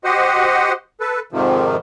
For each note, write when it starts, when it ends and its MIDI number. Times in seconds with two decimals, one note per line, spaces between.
0.04 0.72 66
0.04 0.72 67
0.04 0.72 72
0.04 0.72 75
0.04 0.72 78
1.00 1.20 69
1.00 1.20 71
1.32 1.76 41
1.32 1.76 44
1.32 1.76 48
1.32 1.76 51
1.32 1.76 53